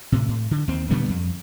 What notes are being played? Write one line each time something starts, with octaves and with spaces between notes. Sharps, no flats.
A2 C3
A2
D3
D#2 C4
A#2 D3 G3 B3
F2